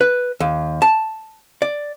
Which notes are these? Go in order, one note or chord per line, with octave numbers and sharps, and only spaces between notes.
B4
D#2
A5
D5